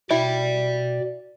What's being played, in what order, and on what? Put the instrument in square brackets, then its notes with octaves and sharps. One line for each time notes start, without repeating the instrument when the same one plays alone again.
[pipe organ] B2 [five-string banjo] E4 [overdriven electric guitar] D5 G5